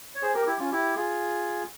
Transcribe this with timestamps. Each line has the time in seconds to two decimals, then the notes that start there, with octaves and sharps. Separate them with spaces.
0.15 C#5
0.22 G#4 C5
0.34 G4 A#4
0.46 E4 G4
0.59 C#4 F4
0.72 E4 G4
0.96 F4 G#4